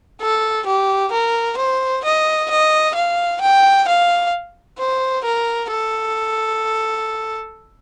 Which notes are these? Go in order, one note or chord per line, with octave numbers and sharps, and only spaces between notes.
A4
G4
A#4
C5
D#5
D#5
F5
G5
F5
C5
A#4
A4